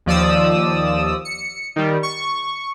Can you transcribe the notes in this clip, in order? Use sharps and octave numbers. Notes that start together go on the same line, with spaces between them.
D#2 F3 D5 D#6 E6
C#7
D#3 G3
C#6